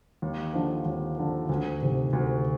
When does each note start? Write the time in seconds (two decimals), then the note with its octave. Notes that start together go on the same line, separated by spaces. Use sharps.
0.22 D#2
0.54 D3 F3
0.85 D#2
1.18 D3 F3
1.49 D2
1.82 C3 D#3
2.13 D2